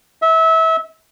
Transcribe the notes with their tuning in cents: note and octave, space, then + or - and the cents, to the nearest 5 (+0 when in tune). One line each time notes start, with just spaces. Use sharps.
E5 -25